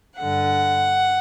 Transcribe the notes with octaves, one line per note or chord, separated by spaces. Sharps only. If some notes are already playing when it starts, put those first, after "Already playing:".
G2 D3 F#5